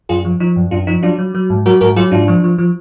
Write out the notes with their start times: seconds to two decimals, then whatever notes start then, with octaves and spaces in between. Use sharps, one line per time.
0.09 F#2 F4 G#4
0.25 F3
0.40 F3 D#4
0.56 F#2
0.71 F#2 D4 F4
0.87 F3 D#4
1.03 F#3 D4 F4
1.18 F#3
1.35 F#3
1.50 G#2
1.66 F#3 F#4 A#4
1.81 G#2 F#4 A#4
1.96 F#3 F4 G#4
2.12 G#2 D4 F4
2.28 F3
2.44 F3
2.58 F3